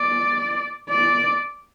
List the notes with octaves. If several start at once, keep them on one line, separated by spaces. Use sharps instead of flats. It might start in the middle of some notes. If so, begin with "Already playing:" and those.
Already playing: D5
D5